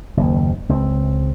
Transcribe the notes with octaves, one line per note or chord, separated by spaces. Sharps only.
F#1 D#2
C#2 C4